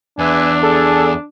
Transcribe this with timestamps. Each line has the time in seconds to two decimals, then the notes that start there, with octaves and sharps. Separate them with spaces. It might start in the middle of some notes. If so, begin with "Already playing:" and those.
0.19 E2 D4 B4 E5 G#5
0.63 G#4 A4